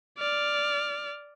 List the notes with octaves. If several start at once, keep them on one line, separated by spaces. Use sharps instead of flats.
D5 F6